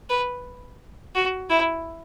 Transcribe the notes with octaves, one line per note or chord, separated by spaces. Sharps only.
B4
F#4
E4